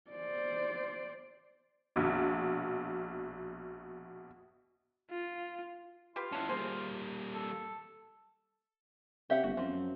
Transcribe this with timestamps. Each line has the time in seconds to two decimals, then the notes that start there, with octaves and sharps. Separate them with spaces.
0.11 C5 D5
1.96 A#1 B2
5.10 F4
6.16 F4 G4 B4
6.32 C#4 E4 F#5 A5
6.49 G3 A#3 G#4 C5
7.34 A4
9.30 C3 G4 E5 F#5
9.43 G1 F#4
9.57 F#2 F3 C4